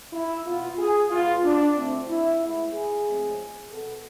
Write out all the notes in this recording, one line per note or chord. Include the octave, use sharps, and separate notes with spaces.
E4
B2 B3 F4
G#4
B2 G#3 B3 F4
D4
D2 D3 A3 C4
E4
A2 G#3 B3 E4
G#4
A2 F3 G#3 C4
B2 B3 A4